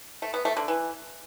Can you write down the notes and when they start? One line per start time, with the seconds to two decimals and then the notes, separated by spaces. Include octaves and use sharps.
0.22 A3
0.34 B3
0.45 A3
0.57 D3
0.68 E3